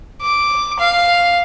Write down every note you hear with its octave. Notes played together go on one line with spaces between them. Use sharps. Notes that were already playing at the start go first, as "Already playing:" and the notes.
D6
F5